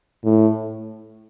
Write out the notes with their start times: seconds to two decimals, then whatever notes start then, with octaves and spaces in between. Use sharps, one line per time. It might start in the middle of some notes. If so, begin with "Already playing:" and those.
0.24 A2